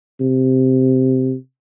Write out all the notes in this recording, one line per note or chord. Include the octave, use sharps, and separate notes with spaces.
C3